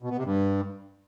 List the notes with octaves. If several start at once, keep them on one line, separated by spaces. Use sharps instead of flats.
B2
B3
C3
G2